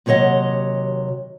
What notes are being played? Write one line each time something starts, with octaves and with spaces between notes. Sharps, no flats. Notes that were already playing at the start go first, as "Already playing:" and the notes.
D#2 C3 F#3 C#5 D#5 F#5